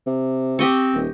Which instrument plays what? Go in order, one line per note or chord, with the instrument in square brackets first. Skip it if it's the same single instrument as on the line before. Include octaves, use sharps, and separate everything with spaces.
[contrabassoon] C3
[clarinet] C4 [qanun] G4 D#5 C#6
[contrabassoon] D#1